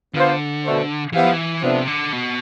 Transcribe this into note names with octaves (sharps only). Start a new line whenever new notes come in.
D3 B3 F4 C5 F5
B2 A3 D4 A4 C5
E3 B3 E4 G4 C5 F5
F3
E3
C3 F3 B3 D4 A4 E5
D3
B2